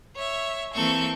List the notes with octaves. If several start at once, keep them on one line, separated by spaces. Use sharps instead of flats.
C#5 E5
E3 A#3 C4 A4 C#6